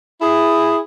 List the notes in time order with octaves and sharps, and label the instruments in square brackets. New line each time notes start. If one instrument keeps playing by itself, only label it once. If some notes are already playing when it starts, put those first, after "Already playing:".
[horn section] E4 G#4